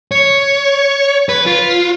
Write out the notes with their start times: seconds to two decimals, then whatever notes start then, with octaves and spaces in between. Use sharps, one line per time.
0.12 C#5
1.29 B4
1.46 F4